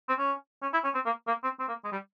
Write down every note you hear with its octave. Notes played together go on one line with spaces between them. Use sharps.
C4
C#4
C#4
E4
C#4
C4
A#3
A#3
C4
C4
A#3
G#3
G3